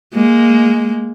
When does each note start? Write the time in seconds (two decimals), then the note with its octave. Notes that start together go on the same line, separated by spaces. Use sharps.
0.14 G#3 A#3